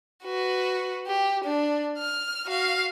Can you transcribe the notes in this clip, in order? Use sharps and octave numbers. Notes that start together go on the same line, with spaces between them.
F#4 B4
G4
D4
F6
F#4 F5